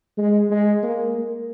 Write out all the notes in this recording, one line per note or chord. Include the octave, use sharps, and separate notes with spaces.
G#3
G#3
A#3
A#3